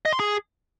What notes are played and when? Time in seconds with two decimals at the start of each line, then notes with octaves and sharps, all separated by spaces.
0.05 D#5
0.13 C6
0.20 G#4